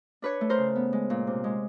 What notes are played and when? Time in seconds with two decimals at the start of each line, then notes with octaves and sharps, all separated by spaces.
0.22 D4 B4 C#5
0.41 A3
0.50 A#4 C5
0.58 C#3
0.76 B3
0.93 G#3
1.10 A#2
1.27 C3
1.44 G#3